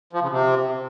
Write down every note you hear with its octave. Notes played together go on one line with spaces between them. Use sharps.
F3
C#3
C3